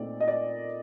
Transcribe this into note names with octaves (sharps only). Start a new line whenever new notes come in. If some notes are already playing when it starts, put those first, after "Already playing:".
Already playing: A#2 A3 C4 D#4 D5
D#5
D5